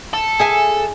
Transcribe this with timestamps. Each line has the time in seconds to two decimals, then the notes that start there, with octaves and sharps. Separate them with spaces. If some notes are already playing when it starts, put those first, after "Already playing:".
0.14 A4
0.39 G#4 E5 G#5